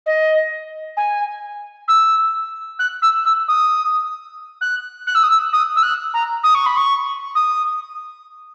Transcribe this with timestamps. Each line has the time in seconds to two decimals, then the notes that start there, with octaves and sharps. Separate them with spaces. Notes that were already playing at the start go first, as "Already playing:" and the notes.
0.06 D#5
0.97 G#5
1.88 E6
2.79 F#6
3.02 E6
3.25 E6
3.48 D#6
4.61 F#6
5.07 F#6
5.15 E6
5.23 D#6
5.30 E6
5.53 D#6
5.76 E6
5.83 F#6
6.14 A#5
6.43 D#6
6.55 C#6
6.66 B5
6.77 C#6
7.35 D#6